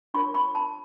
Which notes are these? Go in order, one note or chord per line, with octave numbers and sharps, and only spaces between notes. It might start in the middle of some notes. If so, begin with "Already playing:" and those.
D4 F4 A#4 C#5 B5 C#6
B5 C#6
A5 B5